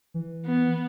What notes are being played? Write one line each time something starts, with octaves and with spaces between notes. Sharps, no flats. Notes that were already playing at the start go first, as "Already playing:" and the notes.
E3
B3